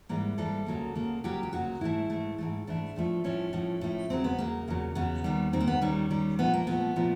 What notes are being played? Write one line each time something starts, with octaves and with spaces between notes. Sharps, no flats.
G#2 E3 G3 A#3
G#2 E3 G3 A#3 A4
D2 C#3 F#3 A#3
D2 C#3 F#3 A#3
D2 C#3 F#3 A#3 G4
G4
D2 C#3 F#3 A#3 F#4
G#2 E3 A3 E4
G#2 E3 A3
G#2 E3 A3
G#2 E3 A3 D4
A2 F3 A3
A2 F3 A3 C#4
A2 F3 A3
A2 F3 A3
E2 C#3 F#3 C4
B3
E2 C#3 F#3 A#3
E2 C#3 F#3
E2 C#3 F#3 B3
D#2 D#3 G3
D#2 D#3 G3 C4
A#3
B3
D#2 D#3 G3 C#4
D#2 D#3 G3
A#2 F3 A3 B3
A#3
A#2 F3 A3 B3
A#2 F3 A3